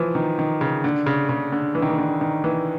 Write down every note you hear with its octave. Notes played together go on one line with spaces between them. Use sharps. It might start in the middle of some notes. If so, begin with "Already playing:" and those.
Already playing: E3 F3
D#3
D#3
C#3
D3
C#3
C#3
D3
E3
D#3
E3
D3
D#3
E3